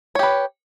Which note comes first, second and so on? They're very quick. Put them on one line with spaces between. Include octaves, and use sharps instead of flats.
C#5 G4 B4